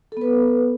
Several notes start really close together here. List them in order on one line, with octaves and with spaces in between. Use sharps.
A4 B3 B4